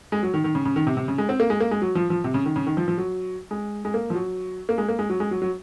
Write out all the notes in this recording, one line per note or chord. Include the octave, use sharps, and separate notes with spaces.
G#3
F#3
D#3
D#3
C#3
C#3
D#3
C3
C3
C#3
G#3
C4
A#3
G#3
A#3
G#3
F#3
F3
F3
C3
C#3
D#3
C#3
D#3
F3
F3
F#3
G#3
G#3
A#3
F3
F#3
A#3
G#3
A#3
G#3
F#3
G#3
F#3
F#3